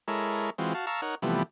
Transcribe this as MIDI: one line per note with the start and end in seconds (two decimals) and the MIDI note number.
0.08 0.50 56
0.08 0.50 64
0.08 0.50 69
0.08 0.50 70
0.08 0.50 73
0.58 0.73 52
0.58 0.73 56
0.58 0.73 60
0.58 0.73 65
0.58 0.73 66
0.74 0.86 66
0.74 0.86 77
0.74 0.86 81
0.87 1.01 77
0.87 1.01 81
0.87 1.01 82
0.87 1.01 85
0.87 1.01 88
1.02 1.15 63
1.02 1.15 70
1.02 1.15 73
1.02 1.15 78
1.22 1.43 48
1.22 1.43 52
1.22 1.43 53
1.22 1.43 55
1.22 1.43 57
1.22 1.43 59